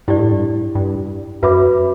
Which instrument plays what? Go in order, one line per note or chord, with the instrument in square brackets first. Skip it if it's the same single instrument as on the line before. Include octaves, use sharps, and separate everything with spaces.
[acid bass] G2 [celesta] E4 G4 D5
[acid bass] A2
G2
G2
[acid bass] F#2 [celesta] F#4 B4 E5 B5 D6